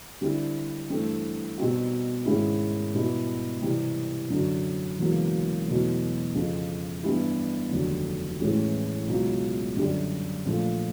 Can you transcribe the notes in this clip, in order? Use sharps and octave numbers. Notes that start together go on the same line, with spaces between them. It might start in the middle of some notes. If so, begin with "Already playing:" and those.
D3 G3 C4 E4
G2 E3 A3 C4
B2 G3 C4 D#4 F#4
G#2 D#3 G#3 C#4 E4
B2 G3 B3 E4
C3 E3 G3
F#2 D3 F#3
E1 E2 C#3 F#3 A#3
E2 B2 F#3 A3
F2 C#3 F3
G2 E3 G3 B3 E4
F1 D#2 D3 F#3
A1 A2 E3 G#3 C#4
C#2 B2 F#3
F#2 D3 G3
A#1 A#2 F3 A3